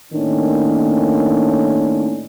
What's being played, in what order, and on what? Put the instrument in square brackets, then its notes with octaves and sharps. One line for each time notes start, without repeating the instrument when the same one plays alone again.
[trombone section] A2 D#3 A#3 C#4 D4